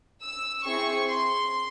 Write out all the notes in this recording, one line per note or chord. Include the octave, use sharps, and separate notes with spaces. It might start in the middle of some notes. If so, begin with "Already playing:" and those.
E6
C4 E4 G#4 C#6
C6